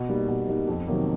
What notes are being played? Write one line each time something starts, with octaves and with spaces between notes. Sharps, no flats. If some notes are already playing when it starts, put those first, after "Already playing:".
Already playing: B2
G3 A#3 D#4
B2
G3 A#3 D#4
F2
C3 D#3 F#3 A#3